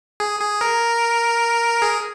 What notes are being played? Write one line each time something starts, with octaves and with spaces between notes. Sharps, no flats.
G#4
G#4
A#4
G#4